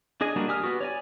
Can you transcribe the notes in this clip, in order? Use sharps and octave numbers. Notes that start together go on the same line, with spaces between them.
D4 G#4 D#5 G#5
G3 A#3 D4 F#4
G4 G#5 D#6 F6
B3 F#4 G4
C#5 D5 G#5